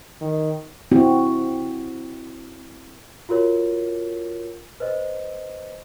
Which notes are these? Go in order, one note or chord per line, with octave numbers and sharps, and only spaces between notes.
D#3
C4 E4 F#4
F4 F#4 A#4 C#5
B4 C5 D#5